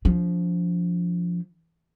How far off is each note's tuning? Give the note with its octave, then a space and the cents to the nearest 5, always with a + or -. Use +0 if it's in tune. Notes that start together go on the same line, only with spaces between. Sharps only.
F3 +0 D4 -35